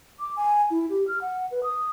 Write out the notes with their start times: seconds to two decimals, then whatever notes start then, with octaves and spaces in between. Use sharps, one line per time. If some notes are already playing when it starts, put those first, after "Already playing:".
0.20 D6
0.36 G#5
0.71 E4
0.90 G4
1.07 F6
1.21 F#5
1.51 B4
1.63 D#6